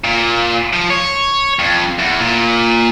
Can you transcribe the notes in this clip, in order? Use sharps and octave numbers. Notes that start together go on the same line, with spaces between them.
A#2
F3
C#5
F2
E2
A#2